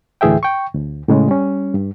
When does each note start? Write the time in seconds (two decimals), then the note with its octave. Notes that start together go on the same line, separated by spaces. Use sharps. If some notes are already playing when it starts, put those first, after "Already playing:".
0.21 D2 A2 E3 G#4 E5 G5
0.43 G5 C#6
0.75 D2
1.08 A2 C#3 G#3
1.28 G3 C#4
1.74 G2